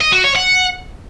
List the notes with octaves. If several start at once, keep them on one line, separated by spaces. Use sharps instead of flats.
D#5
F#4
C#5
F#5